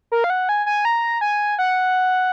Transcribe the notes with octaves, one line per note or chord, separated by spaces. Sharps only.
A#4
F5
F#5
G#5
G#5
A#5
G#5
F#5